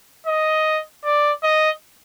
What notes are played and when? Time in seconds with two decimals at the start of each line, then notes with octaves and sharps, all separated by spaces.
0.27 D#5
1.05 D5
1.43 D#5